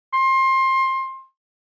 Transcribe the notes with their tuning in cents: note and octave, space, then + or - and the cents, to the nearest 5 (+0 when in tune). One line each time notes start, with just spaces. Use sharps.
C6 +25